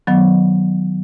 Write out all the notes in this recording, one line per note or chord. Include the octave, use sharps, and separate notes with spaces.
D#3 F#3 B3